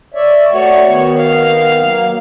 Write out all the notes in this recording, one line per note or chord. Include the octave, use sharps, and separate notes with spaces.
C#5 D5 E5
A3 F#4 C#5 D5
D#3 B3
F5
F#3 A#3